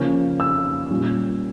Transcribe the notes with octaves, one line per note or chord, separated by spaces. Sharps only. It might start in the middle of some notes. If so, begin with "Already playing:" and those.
Already playing: C#3 F3 A#3 C#4
E6
A#2 G3 C#4